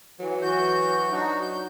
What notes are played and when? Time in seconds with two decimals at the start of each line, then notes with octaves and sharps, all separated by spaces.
0.20 E3 F#3
0.42 E3 F#4 G6
1.12 F#3 D4 D#4 F#4
1.41 G6